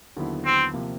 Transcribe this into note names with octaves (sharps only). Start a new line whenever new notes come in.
D#2 D3 F#3 B3 E4
C4
C3 F3 A#3